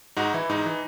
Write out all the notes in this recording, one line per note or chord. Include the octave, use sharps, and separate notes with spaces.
G#2 D#4 F#4
E3 E4
G#2 D#4
E3